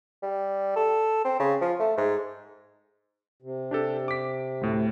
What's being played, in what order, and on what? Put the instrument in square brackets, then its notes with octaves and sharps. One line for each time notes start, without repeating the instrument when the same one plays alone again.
[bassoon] G3
A4
C4
C#3
F3
A3
G#2
[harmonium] C3
[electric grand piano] D4 G4 A4
D6 B6
D2 A2